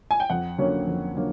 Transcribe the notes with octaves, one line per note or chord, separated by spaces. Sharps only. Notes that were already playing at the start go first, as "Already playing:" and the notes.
G#5
G5
F2 F#5
D3 F#3 A#3 C#4
F2
D3 F#3 A#3